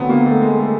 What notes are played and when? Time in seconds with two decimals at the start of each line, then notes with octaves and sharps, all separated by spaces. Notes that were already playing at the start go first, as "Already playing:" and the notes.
Already playing: D2 D3 F#3 B3 C4
0.09 A#3
0.26 A3
0.42 G#3
0.59 A3